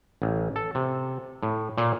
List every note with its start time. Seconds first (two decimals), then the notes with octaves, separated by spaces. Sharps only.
0.22 A1
0.56 A4
0.75 C3
1.43 A2
1.78 A#2